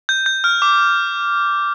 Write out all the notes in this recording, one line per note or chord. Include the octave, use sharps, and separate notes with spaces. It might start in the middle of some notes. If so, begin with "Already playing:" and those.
G6
G6
F6
D6